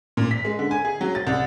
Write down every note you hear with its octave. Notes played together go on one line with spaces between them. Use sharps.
A#2
B6
G#3
D3
G#5
G#4
F#3
A6
C2